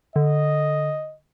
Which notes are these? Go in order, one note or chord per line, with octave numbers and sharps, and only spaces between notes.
D3 D#5